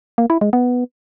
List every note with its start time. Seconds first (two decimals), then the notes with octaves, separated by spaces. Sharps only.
0.18 A#3
0.30 E4
0.41 G#3
0.53 B3